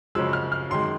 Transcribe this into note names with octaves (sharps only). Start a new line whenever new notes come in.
F#2 C#3 F3 G#3 E6
F6
F6
F#2 D#3 G#3 C6